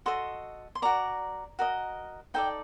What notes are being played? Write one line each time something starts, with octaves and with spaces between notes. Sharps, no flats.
F#4 A4 D#5 C6
C6
F#4 A#4 D5 A#5
F#4 A#4 D#5
D#4 A4 D5 G5